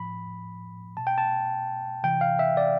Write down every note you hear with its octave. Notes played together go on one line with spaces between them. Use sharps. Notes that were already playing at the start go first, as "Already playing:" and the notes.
Already playing: A2 F3 B5
B2 A5
G5
A5
C3 E3 G5
F5
E5
D5